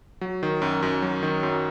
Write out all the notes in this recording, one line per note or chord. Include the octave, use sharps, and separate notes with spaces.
F#3
D#3
F#2
F#2
F#3
D#3
F#2